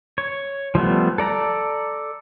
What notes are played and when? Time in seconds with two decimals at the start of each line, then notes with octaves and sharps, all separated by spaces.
0.18 C#5
0.75 F3 G3 A3 B3
1.18 A4 D5 A#5